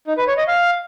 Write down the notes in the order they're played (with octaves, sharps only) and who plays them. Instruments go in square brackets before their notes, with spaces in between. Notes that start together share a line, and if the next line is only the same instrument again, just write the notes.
[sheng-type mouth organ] D#4
B4
C#5
D#5
F5